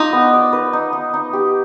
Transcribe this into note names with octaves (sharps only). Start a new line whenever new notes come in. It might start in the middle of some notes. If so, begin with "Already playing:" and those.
Already playing: D#4 F4 D5
B3
D5
B4
D#4
D#4
D#4
G4